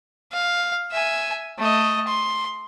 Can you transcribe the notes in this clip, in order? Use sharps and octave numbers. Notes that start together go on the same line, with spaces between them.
F5
E5 G#5
A3 D#5
C6